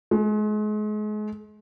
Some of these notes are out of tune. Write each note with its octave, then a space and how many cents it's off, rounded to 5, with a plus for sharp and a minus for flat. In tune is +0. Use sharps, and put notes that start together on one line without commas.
G#3 +35